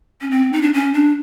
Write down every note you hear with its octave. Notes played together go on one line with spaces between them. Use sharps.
C#4
C4
D#4
D4
C#4
D4